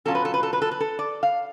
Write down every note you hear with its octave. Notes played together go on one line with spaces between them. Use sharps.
B2 F#3 C#4 F4 A4
B4
A4
B4
A4
B4
A4
B4
A4
D5
F5